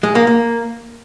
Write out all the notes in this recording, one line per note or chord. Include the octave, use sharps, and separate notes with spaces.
G#3
A#3
A#3